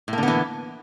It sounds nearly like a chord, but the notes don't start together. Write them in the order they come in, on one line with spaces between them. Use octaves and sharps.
A2 A#3 D3 B3 E3